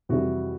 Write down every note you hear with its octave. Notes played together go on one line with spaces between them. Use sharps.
F2 C3 E3 G3 E4 F#4